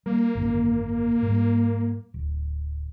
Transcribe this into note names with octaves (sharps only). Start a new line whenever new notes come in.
G3 A#3
G#1 F#2 D3
G#2 G3
D1